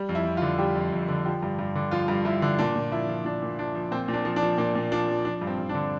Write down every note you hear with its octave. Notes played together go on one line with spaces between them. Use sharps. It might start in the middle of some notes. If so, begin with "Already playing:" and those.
Already playing: G3
F2
E4
F2
F4
D3
G3 G4
F2
F2
D3
F3 G4
G2
G2
D3
F3 F4
G2
G2 E4
D3
A#2 D4
A#2
F3 E4
F3
A#2 D4
A#2
F3 D4
F3
A#2 C4
A#2
D4
F3
D4
F3
A#2 D4
A#2
F3 D4
F3
F3 D4
G2
C4
G2
D4
D3